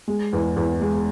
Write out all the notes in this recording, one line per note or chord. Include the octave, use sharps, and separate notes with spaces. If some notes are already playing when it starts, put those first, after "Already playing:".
G#3
E2
E2
G#3